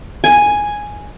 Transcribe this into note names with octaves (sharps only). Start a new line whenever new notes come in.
G#5